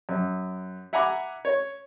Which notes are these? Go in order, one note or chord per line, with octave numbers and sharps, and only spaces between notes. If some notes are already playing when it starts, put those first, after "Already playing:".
F#2
E5 F#5 G#5 A#5 B5 D6
C#5